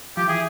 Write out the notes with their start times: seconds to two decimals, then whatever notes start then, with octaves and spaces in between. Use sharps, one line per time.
0.17 F3 G4
0.28 E3 G#4